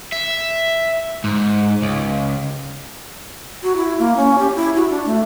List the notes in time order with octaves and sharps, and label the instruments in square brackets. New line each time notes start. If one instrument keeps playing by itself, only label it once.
[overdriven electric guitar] E5
G#2
C#2
[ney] F#4
E4
A#3
C#4
G4
E4
F#4
D4
A3